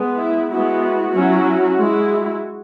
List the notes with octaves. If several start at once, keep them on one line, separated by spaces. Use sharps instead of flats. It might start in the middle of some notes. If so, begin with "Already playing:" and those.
Already playing: G#3 B3
E4
G#3 B3 E4 F#4
F#3 C#4 E4
G#3 E4